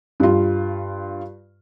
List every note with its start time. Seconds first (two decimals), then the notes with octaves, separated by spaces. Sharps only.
0.20 G2 F4